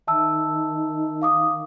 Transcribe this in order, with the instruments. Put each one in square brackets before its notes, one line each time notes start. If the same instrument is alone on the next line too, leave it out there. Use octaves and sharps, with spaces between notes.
[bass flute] D#3 [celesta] E5 A5 E6
[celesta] F5 D6 D#6